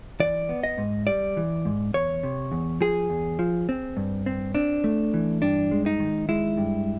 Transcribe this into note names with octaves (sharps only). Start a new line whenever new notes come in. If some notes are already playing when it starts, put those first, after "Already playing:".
E3 D5
B3
D#5
G#2
G3 D5
E3
G#2
E2 C#5
C3
E2
F3 G#4
E2
F3
C4
G2
C4
C4 D4
A3
E3
G2 D4
G#3
D#4
D#3
G#3 E4
G2